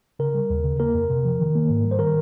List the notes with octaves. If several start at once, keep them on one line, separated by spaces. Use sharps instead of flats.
C#3 A#4
G3
D#2
C#3
A#3 A#4
F2
C3
F3
D#3
A#3
G#2
G3
C5
D#3 A#4